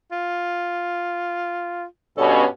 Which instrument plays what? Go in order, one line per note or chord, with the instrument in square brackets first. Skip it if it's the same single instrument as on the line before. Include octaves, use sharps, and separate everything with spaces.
[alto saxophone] F4
[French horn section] G2 B2 C#4 [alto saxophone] A4